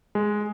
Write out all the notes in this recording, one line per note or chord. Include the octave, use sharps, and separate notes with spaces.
G#3